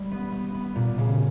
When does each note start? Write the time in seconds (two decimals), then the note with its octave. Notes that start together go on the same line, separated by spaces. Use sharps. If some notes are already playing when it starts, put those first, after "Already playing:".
Already playing: G3
0.12 B3
0.32 B3
0.54 B3
0.76 A#2
0.98 C#3